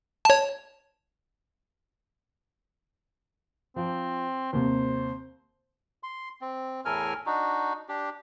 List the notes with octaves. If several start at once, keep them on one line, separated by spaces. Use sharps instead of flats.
C#5 A5
F3 C4
D#2 C3 C5
C6
C4
E2 A2 A4 A#4 G#5 F6
D4 D#4 F#4
D4 G4